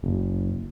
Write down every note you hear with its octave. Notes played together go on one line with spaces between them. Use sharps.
F#1